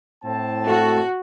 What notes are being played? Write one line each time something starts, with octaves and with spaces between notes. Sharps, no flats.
A2 C4 A5
A3 F#4